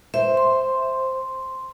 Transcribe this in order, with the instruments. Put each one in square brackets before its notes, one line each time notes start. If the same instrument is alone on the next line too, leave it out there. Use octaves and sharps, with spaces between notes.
[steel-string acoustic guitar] C5 [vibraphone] E5
[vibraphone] C6